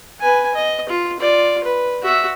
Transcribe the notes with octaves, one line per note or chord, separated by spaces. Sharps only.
B4 G#5
D#5
F4
F4 D5
B4
F#4 E5